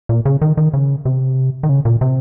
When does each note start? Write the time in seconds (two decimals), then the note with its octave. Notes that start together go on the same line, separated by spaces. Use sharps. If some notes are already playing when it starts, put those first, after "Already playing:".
0.09 A#2
0.26 C#3
0.42 D#3
0.57 D#3
0.74 C#3
1.05 C3
1.63 D#3
1.69 C#3
1.85 A#2
2.01 C3